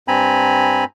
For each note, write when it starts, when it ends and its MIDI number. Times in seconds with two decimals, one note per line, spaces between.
0.08 0.84 43
0.08 0.84 60
0.08 0.84 80
0.08 0.84 82
0.08 0.84 83